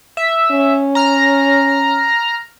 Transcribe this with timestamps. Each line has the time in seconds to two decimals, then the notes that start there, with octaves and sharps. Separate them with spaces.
0.17 E5
0.51 C#4
0.95 A#5 F6